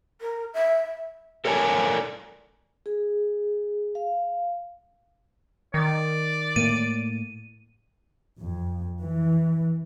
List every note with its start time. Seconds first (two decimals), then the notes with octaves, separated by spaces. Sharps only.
0.21 A#4
0.54 E5
1.45 A4 A#4 C#5 D5 G#5 A5
2.86 G#4
3.95 F5
5.74 D#3 D5
6.56 A2 A#3 D#7
8.40 F2
9.01 E3